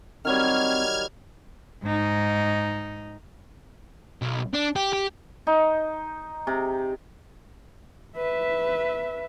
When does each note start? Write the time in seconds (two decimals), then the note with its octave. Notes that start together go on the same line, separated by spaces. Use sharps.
0.25 D#3 F#3 G3 C4 F6 G#6
1.83 G#2 D#4
4.22 B1
4.54 D4
4.76 G4
4.93 G4
5.47 D#4
6.47 C3
8.17 B4 E5